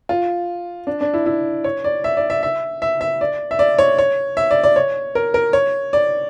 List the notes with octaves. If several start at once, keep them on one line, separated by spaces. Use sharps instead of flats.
F4
D4
D4
E4
E4
C#5
D5
E5
D5
E5
E5
E5
E5
D5
E5
D5
C#5
C#5
E5
D5
D5
C#5
A#4
A#4
C#5
D5